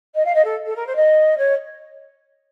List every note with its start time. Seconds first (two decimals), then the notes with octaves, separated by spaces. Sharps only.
0.15 D#5
0.25 F5
0.34 D#5
0.44 A4
0.66 A4
0.76 A#4
0.86 C5
0.95 D#5
1.37 C#5